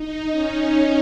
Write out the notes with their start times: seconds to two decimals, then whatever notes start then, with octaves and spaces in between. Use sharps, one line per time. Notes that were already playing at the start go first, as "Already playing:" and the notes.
Already playing: D#4
0.31 C#4